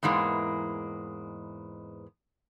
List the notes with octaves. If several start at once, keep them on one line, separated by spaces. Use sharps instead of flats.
E2 G#2 E3 G#3 A#3